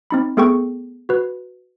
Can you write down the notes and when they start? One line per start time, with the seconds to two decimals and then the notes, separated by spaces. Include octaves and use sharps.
0.11 C4 D#4 B5
0.37 A3 B3 G#4 A4 G5 C#6
1.09 F#4 B4